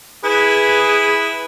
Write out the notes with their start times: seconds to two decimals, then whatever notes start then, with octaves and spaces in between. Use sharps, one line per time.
0.24 E4 G#4 B4